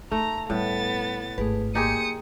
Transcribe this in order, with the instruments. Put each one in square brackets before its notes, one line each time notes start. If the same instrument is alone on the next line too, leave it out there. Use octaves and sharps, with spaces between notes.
[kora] A3 [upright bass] D#4 [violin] A#5
[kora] A2 [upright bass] G3 [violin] B3 A6
[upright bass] G#1 [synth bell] A3 G#4 B4
[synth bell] A#3 G#5 C6 [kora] D#4 G4 G#4 [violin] D#6 C#7